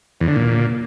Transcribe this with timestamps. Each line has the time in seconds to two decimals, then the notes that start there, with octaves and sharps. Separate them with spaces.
0.21 E2
0.28 D3
0.36 A#2